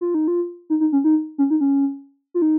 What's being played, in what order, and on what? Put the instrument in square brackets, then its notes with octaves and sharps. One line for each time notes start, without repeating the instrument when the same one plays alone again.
[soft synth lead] F4
D#4
F4
D#4
D#4
C#4
D#4
C#4
D#4
C#4
F4
D#4